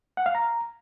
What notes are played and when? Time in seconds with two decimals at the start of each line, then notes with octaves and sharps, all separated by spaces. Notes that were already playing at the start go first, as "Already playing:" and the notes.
0.17 F#5
0.26 F5
0.35 A#5